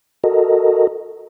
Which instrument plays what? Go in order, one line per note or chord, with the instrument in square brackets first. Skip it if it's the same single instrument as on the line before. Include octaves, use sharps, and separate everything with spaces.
[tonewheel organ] F#4 A4 A#4 D#5